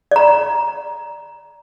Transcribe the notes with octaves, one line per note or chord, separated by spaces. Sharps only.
D5 A#5